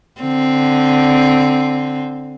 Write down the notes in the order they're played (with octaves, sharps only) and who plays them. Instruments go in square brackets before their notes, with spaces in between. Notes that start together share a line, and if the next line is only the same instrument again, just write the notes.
[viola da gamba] D3 C4